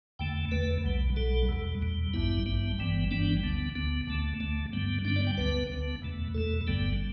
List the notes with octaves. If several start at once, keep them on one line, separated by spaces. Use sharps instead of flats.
E2 D3 A3 G5
E2 D3 A3 B4
B1 B2 G3
B1 B2 G3 A4
E2 B2 G3
E2 B2 G3
A1 G2 G3 B3 E4
A1 G2 G3 B3
G1 G2 E3 G3 B3
G1 G2 E3 G3 B3 D4
D2 D3 B3
D2 D3 B3
D2 D3 A3
D2 D3 A3
G2 D3 G3 B3
G2 D3 G3 B3 D4
D5
G5
D2 D3 B3 B4
D2 D3 B3
E2 B2 A3
E2 B2 A3 A4
G1 G2 D3 G3 B3